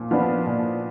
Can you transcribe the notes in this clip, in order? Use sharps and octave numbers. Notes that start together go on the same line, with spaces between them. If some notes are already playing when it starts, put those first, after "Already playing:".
Already playing: A#2 F3
F3 B3 D4
A#2